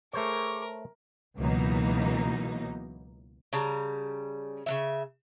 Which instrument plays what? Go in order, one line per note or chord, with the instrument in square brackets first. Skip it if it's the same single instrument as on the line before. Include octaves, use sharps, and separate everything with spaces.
[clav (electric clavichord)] A3 C5 C#5 [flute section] G#4 C#6 D6 [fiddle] A#4
[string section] C#2 B2 E3 F#3 A#3 D#4
[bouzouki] C#3 G3 A5 A#5
C#3 F#3 E5